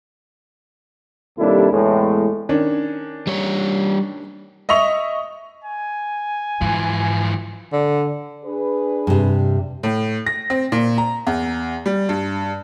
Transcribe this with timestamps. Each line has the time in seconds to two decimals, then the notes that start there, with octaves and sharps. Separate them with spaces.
1.39 D#2 C3 G3 D4 E4 A4
1.72 E2 A2 G#3
2.49 D#3 C#4 D4
3.27 G3 C#5
4.69 D#5 E5 C#6 F7
5.64 G#5
6.61 G#2 E3 F3
7.72 D3
8.45 D4 G#4 B4
9.07 G2 C3
9.83 A2
10.26 A#6
10.50 C4
10.72 A#2
10.98 A#5
11.27 E2
11.86 G3
12.09 G2